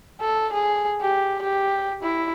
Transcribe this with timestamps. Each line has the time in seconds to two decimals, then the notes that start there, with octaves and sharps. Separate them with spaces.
0.21 A4
0.53 G#4
1.02 G4
1.42 G4
2.03 E4